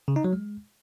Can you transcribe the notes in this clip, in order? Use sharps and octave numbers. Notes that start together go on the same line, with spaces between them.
C#3
D#4
F#3
G#3